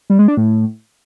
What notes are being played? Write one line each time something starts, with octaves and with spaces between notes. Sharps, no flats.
G3
G#3
D4
A2